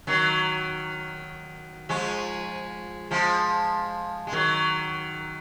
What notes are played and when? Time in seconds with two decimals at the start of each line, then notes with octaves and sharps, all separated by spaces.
0.07 D#3 F#3
1.89 F3 G#3
3.11 F3 G#3
4.27 G#3
4.32 D#3 F#3